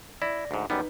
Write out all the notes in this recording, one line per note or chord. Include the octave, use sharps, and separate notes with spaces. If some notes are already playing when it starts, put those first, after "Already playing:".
E4 D5 A#6
D2 G#2
F#2 G3 B3 D#4 B4